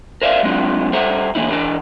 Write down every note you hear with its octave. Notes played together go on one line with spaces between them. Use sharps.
A#4 C5 D5 E5 F5
F#3 G#3 B3 C4 D4 F4
G3 A4 C5 E5 F#5 A#5
D3 E3 A#3 D#4 E4
E3 D4 A#4 A5